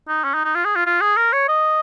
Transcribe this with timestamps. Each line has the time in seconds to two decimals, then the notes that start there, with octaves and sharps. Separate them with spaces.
0.08 D#4
0.24 C#4
0.34 D#4
0.45 D#4
0.55 F4
0.65 G#4
0.76 F4
0.86 F4
1.01 G#4
1.17 A#4
1.33 C#5
1.48 D#5